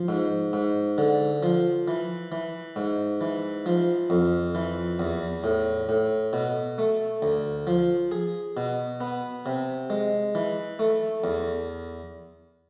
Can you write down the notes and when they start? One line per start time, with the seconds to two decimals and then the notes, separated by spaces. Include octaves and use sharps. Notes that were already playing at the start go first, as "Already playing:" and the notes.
Already playing: F3
0.08 G#2
0.53 G#2
0.98 D3
1.43 F3
1.88 E3
2.32 E3
2.76 G#2
3.21 E3
3.66 F3
4.10 F2
4.55 E3
4.99 E2
5.44 A2
5.89 A2
6.33 B2
6.78 A3
7.22 D2
7.67 F3
8.11 G#4
8.57 B2
9.01 B3
9.46 C3
9.90 G#3
10.35 E3
10.79 A3
11.24 E2